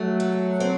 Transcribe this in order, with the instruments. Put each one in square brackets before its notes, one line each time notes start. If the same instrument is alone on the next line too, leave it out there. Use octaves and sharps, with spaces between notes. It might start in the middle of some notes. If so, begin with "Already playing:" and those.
Already playing: [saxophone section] F#3 [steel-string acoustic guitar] A3
[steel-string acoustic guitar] A4
C4